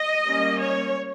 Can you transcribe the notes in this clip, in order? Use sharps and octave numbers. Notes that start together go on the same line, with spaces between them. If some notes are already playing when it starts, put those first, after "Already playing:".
Already playing: D#5
G3 A#3 C#4
C#5